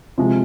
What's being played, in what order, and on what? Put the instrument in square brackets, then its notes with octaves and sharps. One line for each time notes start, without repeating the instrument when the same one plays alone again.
[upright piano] C3 F3 G#3 F4